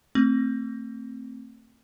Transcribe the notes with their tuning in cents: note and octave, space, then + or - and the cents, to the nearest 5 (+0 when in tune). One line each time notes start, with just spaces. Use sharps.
A3 +30 C4 +15